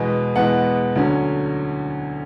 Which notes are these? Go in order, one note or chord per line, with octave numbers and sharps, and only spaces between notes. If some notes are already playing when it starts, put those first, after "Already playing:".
Already playing: E2 B2 G#3 B3 G#5
E2 B2 G#3 B3 F#5
D2 D3 F#3 C#4